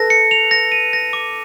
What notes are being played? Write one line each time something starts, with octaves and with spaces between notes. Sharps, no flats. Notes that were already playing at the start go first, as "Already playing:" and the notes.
Already playing: A4 B4 A#6
C#7
F7
A#6
D#7
A#6
D6